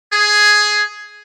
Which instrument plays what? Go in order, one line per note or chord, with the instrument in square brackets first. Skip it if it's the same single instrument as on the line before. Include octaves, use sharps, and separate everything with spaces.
[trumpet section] G#4